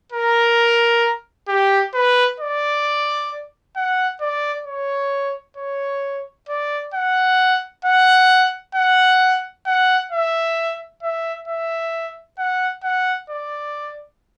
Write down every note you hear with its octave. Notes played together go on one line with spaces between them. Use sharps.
A#4
G4
B4
D5
F#5
D5
C#5
C#5
D5
F#5
F#5
F#5
F#5
E5
E5
E5
F#5
F#5
D5